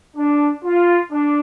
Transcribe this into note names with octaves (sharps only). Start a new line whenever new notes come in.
D4
F4
D4